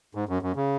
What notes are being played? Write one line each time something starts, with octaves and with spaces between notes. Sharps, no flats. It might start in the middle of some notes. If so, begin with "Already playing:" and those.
G#2
F#2
F#2
C#3